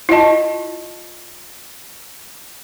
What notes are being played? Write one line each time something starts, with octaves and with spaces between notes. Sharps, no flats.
E4 F4 D#5 A5